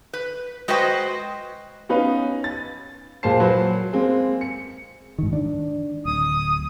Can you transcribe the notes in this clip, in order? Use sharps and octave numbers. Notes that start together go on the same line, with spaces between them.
B4
G#3 F#4 B4 C5 D#5 G5
B3 C#4 D#4 B4 F5
A6
A#2 G#3 A#3 C5 A5 C7
F#3 B4 C5
G#3 A#3 C4
C#7
G#2 D#3
D#3 D4
D1 D#6